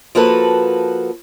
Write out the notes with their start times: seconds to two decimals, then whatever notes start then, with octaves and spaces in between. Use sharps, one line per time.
0.15 F3 A#3 F#4 A4 B4